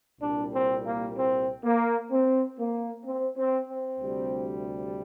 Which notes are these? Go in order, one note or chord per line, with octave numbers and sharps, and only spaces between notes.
C2 A#2 G3 D4
C4
A#3
C4
A#3
C4
A#3
C4
C4
C4
D2 C3 G3